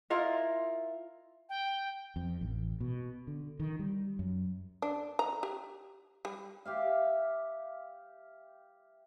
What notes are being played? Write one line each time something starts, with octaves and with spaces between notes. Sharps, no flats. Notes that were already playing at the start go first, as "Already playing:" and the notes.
E4 F4 A#4 D#5
G5
F2
A1
B2
D3
D#3
G3
F#2
D4
A#5
G4
G3
G4 E5 F5